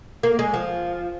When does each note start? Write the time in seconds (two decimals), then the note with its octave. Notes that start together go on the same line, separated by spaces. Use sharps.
0.23 A#3
0.39 G#3
0.54 F3